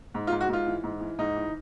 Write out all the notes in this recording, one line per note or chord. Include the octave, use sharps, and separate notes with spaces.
G#2
F4
G#2
F#4
G#2 F4
E3
G#2
E3
G#2 D#4
E3